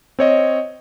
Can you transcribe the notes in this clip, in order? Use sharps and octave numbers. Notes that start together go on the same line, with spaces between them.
C4 C#5 D#5